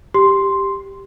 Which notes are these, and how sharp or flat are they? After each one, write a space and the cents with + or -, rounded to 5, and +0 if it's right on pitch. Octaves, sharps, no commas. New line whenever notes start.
G4 +0 C6 +0